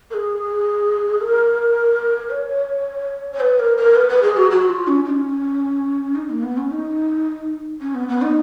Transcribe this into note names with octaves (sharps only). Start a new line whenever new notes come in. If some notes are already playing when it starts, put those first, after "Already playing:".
A#4
G#4
A#4
C#5
C#5
B4
A#4
A#4
B4
B4
G#4
F#4
F#4
F4
C#4
D#4
C#4
D#4
A#3
B3
C#4
D#4
C#4
B3
B3
D#4